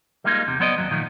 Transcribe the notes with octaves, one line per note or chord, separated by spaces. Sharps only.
G3 G#3 A#3 D#4 F4
E2 C3
F#3 B3 C5 D5 D#5
D#2 A#2 F#3
A#2 D#3 F3 A3